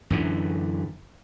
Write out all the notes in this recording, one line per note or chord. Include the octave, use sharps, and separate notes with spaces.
F#2 D3 E3